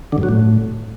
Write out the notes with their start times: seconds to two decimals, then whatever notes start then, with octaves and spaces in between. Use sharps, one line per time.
0.12 D3
0.18 G2
0.23 F#3
0.29 A2